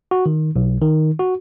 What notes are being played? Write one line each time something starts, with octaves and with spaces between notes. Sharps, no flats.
F#4
D#3
B1
D#3
F#4